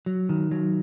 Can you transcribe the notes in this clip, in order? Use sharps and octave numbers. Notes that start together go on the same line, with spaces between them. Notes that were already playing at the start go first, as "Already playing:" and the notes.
F#3
D#3
F#3